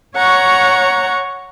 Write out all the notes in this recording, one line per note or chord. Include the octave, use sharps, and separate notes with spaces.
C#5 F#5 A#5 C#6